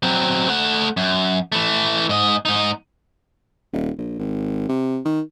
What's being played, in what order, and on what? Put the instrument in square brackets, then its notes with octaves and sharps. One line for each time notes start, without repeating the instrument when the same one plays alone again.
[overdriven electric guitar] F#3 C4
A3 F#5
F#2
E3 A3
G#2 D#5
G#2 D#4
[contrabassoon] D#1
A#1
G#1
C3
D#3